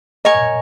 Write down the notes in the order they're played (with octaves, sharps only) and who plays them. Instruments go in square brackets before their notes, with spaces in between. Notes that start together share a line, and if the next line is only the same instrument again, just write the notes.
[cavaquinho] A#4 C#5 G#5 C#6 [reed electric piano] D#5